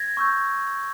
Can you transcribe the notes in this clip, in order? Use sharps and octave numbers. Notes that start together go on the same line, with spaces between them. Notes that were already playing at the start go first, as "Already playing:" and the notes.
Already playing: G#6 A#6
C#6 E6 G6